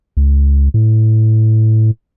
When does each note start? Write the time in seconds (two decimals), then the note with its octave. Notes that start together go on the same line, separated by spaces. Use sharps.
0.17 C#2
0.74 A2